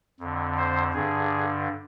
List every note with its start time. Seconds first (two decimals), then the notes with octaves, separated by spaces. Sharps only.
0.20 F2 D3
0.57 C5
0.93 G2 D3 G#4